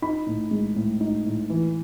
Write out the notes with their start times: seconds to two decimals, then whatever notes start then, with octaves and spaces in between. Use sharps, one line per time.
0.02 D#4 B5
0.27 A2
0.51 G#3
0.76 A2
1.00 D#4
1.25 A2
1.50 E3